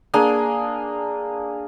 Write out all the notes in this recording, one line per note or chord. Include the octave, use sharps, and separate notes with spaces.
A#3 D4 G#4 G#5